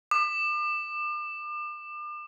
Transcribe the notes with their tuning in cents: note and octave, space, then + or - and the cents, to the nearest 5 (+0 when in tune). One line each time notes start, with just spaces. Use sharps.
D6 +40